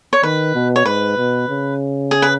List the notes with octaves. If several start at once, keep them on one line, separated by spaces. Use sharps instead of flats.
C#5
D#3 B4
B2
C#5
G#2 B4
B2
C#3
G#4
B4